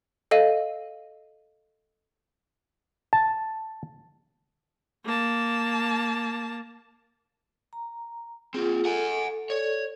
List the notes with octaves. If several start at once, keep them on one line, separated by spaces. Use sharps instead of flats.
A4 D#5 F5 D#7
A5
A#3 A5
A#5
A#3 C4 F4 G#4
A4 F#5 G#5
A4 C#5 D5